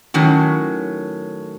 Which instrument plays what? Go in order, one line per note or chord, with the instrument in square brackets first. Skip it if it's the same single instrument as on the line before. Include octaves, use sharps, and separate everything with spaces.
[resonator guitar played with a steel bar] A2 D#3 F#3 C#4